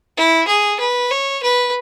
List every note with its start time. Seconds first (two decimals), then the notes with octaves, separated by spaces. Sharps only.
0.17 E4
0.48 G#4
0.80 B4
1.10 C#5
1.43 B4